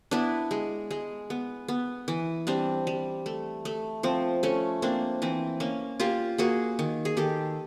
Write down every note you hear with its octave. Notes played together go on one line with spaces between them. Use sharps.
B3 D4 E4
G#3
G#3
B3
B3
E3
G3 C4 D4
G3
A3
A3
F3 C4
A3 C#4
A#3 C4 D4
E3 C4
A#3 C#4
A#3 F4 G4
A#3 F#4 G#4
D#3
G#4
D#3 G4 A4